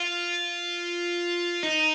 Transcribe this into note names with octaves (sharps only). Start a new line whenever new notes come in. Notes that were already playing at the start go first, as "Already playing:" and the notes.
Already playing: F4
D#4